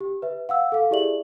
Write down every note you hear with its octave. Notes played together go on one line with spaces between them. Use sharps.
G4
B4 E5
F5 F#5 E6
A4 F5
E4 G4 G#4 D5 E5 F#7